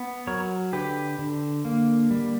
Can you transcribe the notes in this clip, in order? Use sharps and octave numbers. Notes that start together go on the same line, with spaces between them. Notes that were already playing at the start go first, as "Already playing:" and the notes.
Already playing: B3
F#3 A#4 C#5
D3 G4 B4
D3
A#3
G3